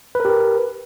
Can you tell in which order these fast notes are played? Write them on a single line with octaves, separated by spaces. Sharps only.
B4 A#4 G4